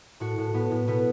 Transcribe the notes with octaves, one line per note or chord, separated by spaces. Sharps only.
A2 F#4
A2
A2 B3
A2
B2 B3